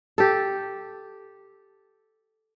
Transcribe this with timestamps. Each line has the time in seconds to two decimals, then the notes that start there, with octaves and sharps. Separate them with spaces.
0.18 G4 A4